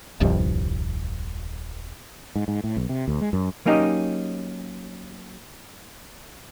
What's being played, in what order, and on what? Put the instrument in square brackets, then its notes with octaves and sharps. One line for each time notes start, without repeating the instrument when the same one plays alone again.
[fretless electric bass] D#1 C2 G2 F3
G#2
G#2
A2
B1
C3
D2
G#3
F#2
[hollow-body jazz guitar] F#3 A#3 C#4 D#4 G4 D#5